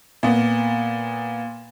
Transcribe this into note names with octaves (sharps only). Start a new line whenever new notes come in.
A#2 B3